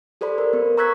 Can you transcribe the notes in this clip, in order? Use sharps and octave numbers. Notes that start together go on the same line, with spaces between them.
G4 A4 C5 D5 B5
A#4
B3
A#5 C#6 E6 F#6 G#6 B6